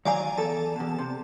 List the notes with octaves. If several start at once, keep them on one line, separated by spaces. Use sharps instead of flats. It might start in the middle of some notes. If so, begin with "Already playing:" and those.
D#3 F#3 D5 F5 G#5 A#5
E2 A4 A5
E2 B2
C3